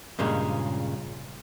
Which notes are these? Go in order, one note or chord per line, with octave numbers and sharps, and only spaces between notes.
G2 A#2 C#3 G#3 C#4